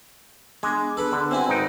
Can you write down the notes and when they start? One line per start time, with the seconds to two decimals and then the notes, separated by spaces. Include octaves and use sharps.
0.63 G#3 B3 D4 G#4 G#5 D6
0.97 A4 B4 B5 D6
1.12 D3
1.31 C4 E4 F#4 G#5
1.49 G#1 D4 D#4 B4 G5